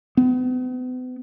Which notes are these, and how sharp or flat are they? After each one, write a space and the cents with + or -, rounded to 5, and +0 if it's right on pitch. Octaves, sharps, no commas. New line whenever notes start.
B3 +40